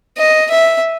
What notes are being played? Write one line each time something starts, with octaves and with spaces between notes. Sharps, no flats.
D#5
E5